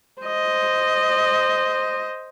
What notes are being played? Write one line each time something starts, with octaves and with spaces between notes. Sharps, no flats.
C5 D#5